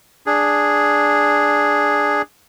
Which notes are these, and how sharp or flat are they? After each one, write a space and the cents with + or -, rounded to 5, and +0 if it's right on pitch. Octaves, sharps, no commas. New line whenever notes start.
D4 +0 G#4 +0